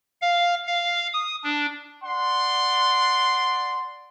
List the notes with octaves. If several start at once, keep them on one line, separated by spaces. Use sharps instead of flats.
F5
F5
D#6
D4
D5 F#5 C6